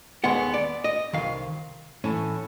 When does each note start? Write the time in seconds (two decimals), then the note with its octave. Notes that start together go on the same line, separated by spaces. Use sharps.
0.24 D#2 D#3 G#3 B3 F#5
0.54 D5
0.84 D#5
1.13 C2 C3 D#3 F5
2.04 A2 E3 A3 C#4